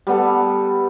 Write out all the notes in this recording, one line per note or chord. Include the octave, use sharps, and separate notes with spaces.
G3 B3 A4